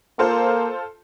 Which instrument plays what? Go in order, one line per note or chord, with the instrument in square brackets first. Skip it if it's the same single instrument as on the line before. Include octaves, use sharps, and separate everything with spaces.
[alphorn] A#3 [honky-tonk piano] F4 A4 C5